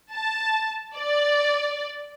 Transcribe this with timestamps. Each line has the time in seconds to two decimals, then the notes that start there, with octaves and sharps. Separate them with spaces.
0.13 A5
0.95 D5